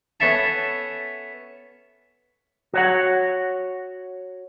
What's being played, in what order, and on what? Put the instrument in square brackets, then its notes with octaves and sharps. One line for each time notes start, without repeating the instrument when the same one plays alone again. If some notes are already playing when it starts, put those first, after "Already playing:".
[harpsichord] B3 C#4 A4 E5 A5
[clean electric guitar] F#4 C#5 F#5